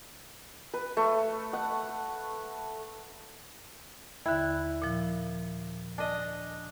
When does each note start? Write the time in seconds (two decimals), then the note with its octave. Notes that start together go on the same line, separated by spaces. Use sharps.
0.74 B4
0.97 A3
1.53 F#5
4.26 D#2 D3 E4
4.82 A#2 F3
5.98 D4 D#5